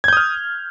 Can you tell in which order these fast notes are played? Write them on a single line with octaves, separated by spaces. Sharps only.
G#6 G6 D#6 F6